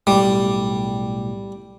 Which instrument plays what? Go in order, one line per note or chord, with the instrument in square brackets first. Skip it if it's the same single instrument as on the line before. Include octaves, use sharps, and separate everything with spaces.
[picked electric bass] B1 A2 [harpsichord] G3